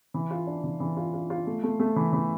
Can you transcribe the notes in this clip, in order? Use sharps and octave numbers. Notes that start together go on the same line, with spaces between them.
E3
F4
D4
E3
E3
F4
F4
F4
A3
A3
A3
E3
E3